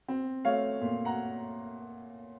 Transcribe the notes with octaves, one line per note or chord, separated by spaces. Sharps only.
C4
A3 C#5 F5
A#2
F#5 A#5